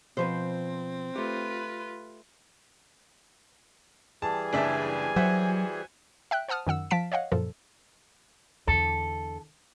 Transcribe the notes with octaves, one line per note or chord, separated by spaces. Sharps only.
B2 F3 C4 B4 C5
A3 F4 G4 B4
E3 G3 G#4 A5
F#1 D4 E5 G#5
F#3 F#4 C5 E5
E5 G5 F#6
C5 F#5 A5 D#6 F6
F#2 D#3 F#5 E6
F3 F5 A5 B6 D7
C#5 D#5 F5 F#5
F#2 A#2 F3 A4
E2 D3 A4